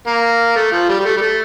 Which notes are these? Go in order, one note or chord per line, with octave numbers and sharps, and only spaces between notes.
A#3
A3
F3
G3
G3
A3
G3
A3